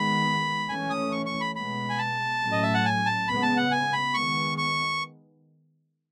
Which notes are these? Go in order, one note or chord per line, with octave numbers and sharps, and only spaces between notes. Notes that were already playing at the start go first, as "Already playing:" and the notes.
Already playing: D#3 G#3 B3 B5
E3 A3 C#4 G#5
D#6
C#6
C#6
B5
B2 G#3 B3 B5
G#5
A5
A2 F#3 A3 C#4
D#5
E5
F#5
G#5
A5
C#3 G#3 B3 B5
A5
F#5
G#5
B5
D#3 G#3 B3 C#6
C#6